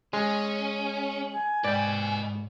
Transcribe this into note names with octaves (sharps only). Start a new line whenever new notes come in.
G#3 C#4 G#4
G#5
G#2 B4 D5 D#5 G5